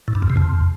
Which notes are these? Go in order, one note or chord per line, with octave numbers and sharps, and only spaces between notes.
A2
G2
F2
C3
F2